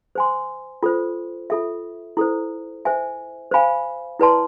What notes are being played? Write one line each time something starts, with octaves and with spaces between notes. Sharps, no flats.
C5 G#5 C6
F4 A4 C5
F4 A4 E5
E4 A4 C5
C5 E5 G#5
C5 F5 G#5 B5
E4 B4 D5 A5 C6